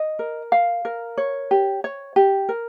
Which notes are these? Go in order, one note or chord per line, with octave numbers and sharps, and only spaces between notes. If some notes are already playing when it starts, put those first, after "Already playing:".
Already playing: D#5
A#4
F5
A#4
C#5
G4
C#5
G4
A#4